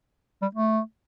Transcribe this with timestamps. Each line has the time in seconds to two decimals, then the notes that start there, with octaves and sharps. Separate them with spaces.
0.42 G3
0.55 A3